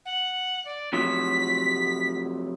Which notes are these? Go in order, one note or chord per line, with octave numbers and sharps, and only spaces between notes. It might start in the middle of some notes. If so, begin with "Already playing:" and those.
F#5
D5
C3 F3 F#3 B6